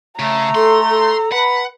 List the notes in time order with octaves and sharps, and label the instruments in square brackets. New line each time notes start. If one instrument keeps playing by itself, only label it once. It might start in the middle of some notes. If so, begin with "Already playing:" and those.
[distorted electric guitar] C#3 [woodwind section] A3 [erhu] A#5
[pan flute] A4 [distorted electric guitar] C6
[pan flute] A4
[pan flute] B4 [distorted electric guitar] F#5 [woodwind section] B5